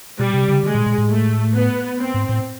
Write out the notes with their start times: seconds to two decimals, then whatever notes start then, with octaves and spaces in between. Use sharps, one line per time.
0.18 B2 G3
0.34 C3
0.49 C#3
0.63 D3 G#3
0.75 A#2
0.86 A#2
0.98 A2
1.09 A3
1.54 B3
1.99 C4
2.14 G#2
2.29 A2